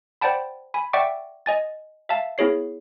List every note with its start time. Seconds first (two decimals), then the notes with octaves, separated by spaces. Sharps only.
0.21 C5 D5 F#5 G5 A5 B5
0.74 G#5 B5
0.93 D5 E5 F#5 G5 C#6 D6
1.46 D#5 G#5 A6
2.09 E5 F5 A5
2.38 B3 E4 G#4 C#5 C7